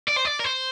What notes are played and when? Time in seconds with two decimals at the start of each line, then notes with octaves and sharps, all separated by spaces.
0.09 D5
0.17 C5
0.26 D5
0.40 A#4
0.44 C5